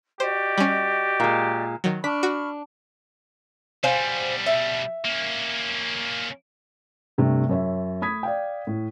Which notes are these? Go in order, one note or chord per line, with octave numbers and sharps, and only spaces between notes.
F#4 G4 C5 D5 D#5
G3 C#4
A#2 G#3
D#3 F#3
D4 B5 C#6 F6 B6
F#4
B2 G3 C5 F5 G#5
E5
A#3 C#4
G2 C3 A3
F#2 C#5 E5
A3 B5 D#6 G#6 B6
D5 F5 G5
A2